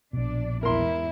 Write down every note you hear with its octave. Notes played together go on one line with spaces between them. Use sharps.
A#1 B2 D4 D5
E2 G#2 E4 A#4 C6